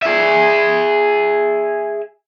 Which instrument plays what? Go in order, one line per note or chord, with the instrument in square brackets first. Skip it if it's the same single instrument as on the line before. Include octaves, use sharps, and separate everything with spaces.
[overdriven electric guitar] G#4 E5